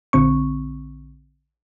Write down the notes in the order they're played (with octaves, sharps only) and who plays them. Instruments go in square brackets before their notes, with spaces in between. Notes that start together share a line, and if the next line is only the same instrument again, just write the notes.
[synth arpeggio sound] A#1 D3 C4 C#6